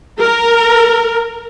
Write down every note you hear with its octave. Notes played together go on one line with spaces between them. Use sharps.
A#4